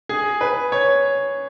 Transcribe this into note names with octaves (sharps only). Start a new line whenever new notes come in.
G#4
B4
C#5